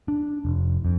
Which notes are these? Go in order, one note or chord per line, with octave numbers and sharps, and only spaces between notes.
D4
F1
F2